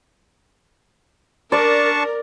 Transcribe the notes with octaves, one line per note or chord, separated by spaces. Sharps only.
D4 A#4 D5 A5 C#6